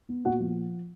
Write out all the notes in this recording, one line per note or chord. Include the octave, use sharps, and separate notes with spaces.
B3
A#2 F#4 F#5
F3